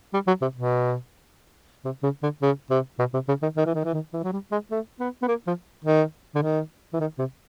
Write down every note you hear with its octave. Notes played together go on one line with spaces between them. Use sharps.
G3
F#3
C3
B2
C3
C#3
D3
C#3
C3
B2
C3
C#3
D#3
D#3
E3
D#3
E3
D#3
E3
F#3
G3
G#3
A3
B3
B3
A#3
F3
D#3
D3
D#3
E3
D#3
C3